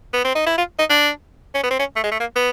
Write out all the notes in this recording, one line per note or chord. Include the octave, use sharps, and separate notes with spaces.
B3
C4
D#4
E4
F4
D#4
D4
C#4
B3
C4
C#4
A3
G#3
A3
A#3
B3